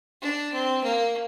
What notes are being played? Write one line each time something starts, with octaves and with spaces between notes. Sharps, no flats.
D4
C4
A#3